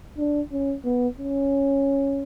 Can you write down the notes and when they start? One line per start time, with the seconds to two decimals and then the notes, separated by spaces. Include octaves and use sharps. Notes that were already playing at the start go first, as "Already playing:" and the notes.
0.18 D4
0.52 C#4
0.85 B3
1.18 C#4